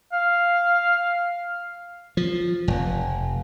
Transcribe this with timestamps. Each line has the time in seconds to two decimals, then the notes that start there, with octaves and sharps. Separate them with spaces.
0.13 F5
2.17 F3
2.68 F1